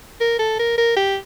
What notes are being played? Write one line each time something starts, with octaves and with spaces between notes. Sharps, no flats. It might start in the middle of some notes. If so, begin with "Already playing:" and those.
A#4
A4
A#4
A#4
G4